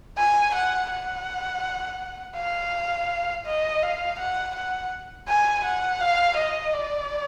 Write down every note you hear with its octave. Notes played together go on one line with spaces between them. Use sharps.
G#5
F#5
F#5
F5
D#5
F5
F#5
F#5
G#5
F#5
F5
D#5
D5